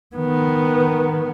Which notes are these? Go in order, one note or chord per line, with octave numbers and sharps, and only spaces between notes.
D#3 B3